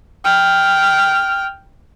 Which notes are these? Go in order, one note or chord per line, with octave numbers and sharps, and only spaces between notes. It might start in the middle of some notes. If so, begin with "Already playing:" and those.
G5 F6